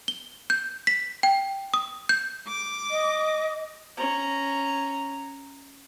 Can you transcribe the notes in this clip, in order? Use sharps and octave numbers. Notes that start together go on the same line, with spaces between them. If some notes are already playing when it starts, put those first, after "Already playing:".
G7
G6
B6
G5
D#6
G6
D6
D#5
C#4 A#5